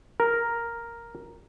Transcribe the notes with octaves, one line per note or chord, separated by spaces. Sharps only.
A#4